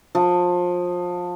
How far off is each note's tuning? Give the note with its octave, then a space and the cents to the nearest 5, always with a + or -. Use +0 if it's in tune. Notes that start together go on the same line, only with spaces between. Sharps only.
F3 +25